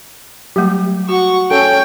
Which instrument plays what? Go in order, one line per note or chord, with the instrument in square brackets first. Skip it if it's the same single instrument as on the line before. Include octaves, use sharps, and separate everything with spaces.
[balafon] F#3 G3 A3 [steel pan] G4
[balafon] F#4 [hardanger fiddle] F#5 C#6
[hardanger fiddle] C#4 C#5 [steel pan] A4 [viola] G5